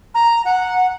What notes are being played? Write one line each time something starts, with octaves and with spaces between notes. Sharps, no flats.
A#5
F#5